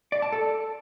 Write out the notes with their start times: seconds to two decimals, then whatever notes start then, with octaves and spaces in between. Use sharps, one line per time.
0.12 D5
0.22 A5
0.32 A4